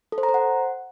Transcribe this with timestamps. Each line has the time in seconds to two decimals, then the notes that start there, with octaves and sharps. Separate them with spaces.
0.12 A4
0.18 C5
0.23 A#5
0.29 C5
0.34 F#5